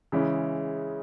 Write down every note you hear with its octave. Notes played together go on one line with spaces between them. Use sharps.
C#3 E3 G#3 C#4